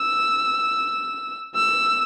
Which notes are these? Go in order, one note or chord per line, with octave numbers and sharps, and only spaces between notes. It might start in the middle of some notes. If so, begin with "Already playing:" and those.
Already playing: E6
E6